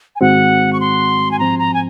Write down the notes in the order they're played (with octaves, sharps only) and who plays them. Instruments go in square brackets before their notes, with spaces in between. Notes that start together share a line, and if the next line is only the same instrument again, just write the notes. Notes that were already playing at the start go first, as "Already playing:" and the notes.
[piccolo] G#5
[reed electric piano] G#2 D#3 G#3 C4 F#4 [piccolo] F#5
[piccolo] C#6
C6
G#5
[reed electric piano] G#2 F3 C4 [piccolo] A#5
[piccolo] A#5
G#5